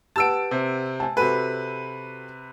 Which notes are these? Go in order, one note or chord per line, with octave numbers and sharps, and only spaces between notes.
G4 B4 F#5 A5 E6 D7
C3
G#5 A5
C3 F#4 A4 B4 G#5